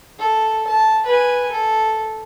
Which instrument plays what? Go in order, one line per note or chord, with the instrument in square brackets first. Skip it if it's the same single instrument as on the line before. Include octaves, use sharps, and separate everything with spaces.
[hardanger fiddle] A4
A5
B4 G#5
A4